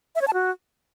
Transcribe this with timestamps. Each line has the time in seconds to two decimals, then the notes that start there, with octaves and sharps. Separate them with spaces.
0.15 E5
0.21 C#5
0.28 A5
0.34 F#4